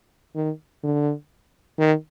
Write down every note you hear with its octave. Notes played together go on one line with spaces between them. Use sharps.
D#3
D3
D#3